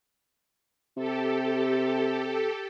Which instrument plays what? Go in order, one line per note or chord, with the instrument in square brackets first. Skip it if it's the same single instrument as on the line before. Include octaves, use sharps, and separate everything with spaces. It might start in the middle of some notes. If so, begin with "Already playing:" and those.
[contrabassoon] C3 [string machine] G4 A4